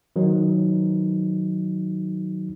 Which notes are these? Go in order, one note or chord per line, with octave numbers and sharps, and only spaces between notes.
D#3 F#3 D#4